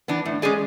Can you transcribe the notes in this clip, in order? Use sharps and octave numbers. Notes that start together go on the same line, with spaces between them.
E3 B3 D4
A2
G#3 C#4 G#4 D5